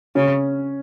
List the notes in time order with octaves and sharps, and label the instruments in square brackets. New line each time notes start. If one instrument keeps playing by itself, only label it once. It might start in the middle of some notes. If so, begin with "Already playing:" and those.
[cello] C#3 [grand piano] C#4